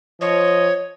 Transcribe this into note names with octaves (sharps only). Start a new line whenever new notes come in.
F3 C#5 D#5